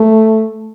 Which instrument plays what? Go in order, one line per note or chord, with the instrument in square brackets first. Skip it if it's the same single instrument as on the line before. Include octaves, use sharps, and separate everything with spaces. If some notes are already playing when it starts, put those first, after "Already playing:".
Already playing: [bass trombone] A3